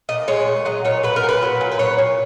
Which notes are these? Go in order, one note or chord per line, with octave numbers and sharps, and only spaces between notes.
A#2 D#5
G#3 C#5
A#2
F#3 D#5
A#2 C#5
F#3 B4
A#4
A#2
B4
F#3
A#2
B4
F#3 C#5
A#2